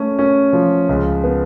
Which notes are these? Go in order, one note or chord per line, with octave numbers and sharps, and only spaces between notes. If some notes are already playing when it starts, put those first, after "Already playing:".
Already playing: A3 C#4
C#4
F3
C#2
B3